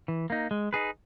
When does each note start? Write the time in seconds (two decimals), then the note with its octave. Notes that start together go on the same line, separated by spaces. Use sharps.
0.08 E3
0.30 A#3 D#4
0.51 G#3
0.73 D#4 G#4 B4